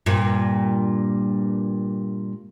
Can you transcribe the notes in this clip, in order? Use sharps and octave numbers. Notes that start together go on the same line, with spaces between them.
G2 A#2